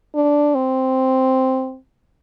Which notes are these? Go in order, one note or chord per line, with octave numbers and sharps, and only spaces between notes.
D4
C4